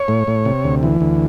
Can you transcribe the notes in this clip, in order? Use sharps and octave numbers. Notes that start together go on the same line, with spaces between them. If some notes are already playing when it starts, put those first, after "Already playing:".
Already playing: C#5
A2
A2
C3
D2
E3
D2